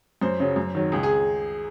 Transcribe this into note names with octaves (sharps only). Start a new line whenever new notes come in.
F#2 C5
C#3 F#3
F#2
D#3 F#3
C#2 G#4
G#4